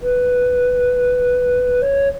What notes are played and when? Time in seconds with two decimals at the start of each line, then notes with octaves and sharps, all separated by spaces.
0.02 B4
1.82 C#5